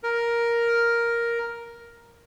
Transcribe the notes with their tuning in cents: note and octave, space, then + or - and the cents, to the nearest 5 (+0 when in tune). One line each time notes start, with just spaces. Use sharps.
A#4 +5